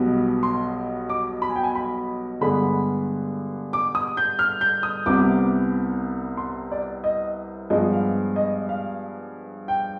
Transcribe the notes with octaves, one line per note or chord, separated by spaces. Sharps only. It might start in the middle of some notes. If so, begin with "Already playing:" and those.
Already playing: B1 B2 G3 B3
C6
D6
B5
G#5
G5
G#5
B5
G2 D3 G#3 B3 B5
D6
D#6
G6
F6
G6
D#6
C2 C3 G3 B3 D6
C6
D5
D#5
G2 F3 G#3 B3 D#5
F5
D#5
F5
G5